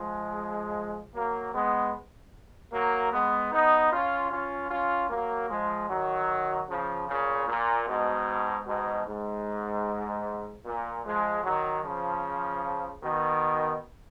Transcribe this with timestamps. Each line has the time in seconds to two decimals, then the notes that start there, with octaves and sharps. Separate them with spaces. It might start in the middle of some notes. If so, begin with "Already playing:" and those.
Already playing: F3 G#3
1.14 F#3 A#3
1.54 G#3 B3
2.72 F#3 A#3
3.12 G#3 B3
3.52 B3 D#4
3.91 C#4 F4
4.31 C#4 F4
4.70 C#4 F4
5.10 F#3 A#3
5.50 F3 G#3
5.89 D#3 F#3
6.68 C#3 F3
7.08 A#2 C#3
7.47 A#2
7.87 G#2 B2
8.67 G#2 B2
9.07 G#2
10.65 A#2
11.05 F3 G#3
11.44 D#3 F#3
11.83 C#3 F3
13.02 B2 D#3